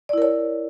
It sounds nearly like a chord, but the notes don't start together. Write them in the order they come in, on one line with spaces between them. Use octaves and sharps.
D5 E4 A#4 C#5